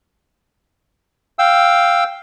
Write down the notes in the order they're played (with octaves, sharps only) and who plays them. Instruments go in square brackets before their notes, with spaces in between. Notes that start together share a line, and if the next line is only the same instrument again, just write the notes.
[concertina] F5 G5 E6